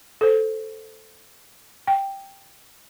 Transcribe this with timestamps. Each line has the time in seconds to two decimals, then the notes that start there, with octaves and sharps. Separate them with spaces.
0.21 A4 C5
1.87 G5